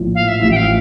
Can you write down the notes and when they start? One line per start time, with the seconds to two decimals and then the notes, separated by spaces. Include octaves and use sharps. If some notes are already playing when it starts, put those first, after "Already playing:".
Already playing: A#1 A2 F3
0.14 F5
0.28 E5
0.40 A1 A2 F3 E5
0.51 G5
0.56 F5